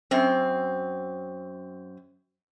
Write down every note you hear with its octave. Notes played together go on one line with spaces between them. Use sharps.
F#2 C4